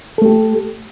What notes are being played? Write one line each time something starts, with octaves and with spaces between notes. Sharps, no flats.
A3 G4 A4